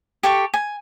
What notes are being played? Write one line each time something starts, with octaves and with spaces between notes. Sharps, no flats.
G4 A4 G5 C#6
G#5